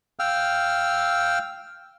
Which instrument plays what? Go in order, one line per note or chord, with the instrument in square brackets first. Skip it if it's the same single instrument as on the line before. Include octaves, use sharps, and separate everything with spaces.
[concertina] F5 G5 E6 F6